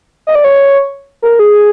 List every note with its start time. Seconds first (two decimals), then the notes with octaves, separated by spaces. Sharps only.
0.27 D#5
0.35 D5
0.44 C#5
1.22 A#4
1.39 G#4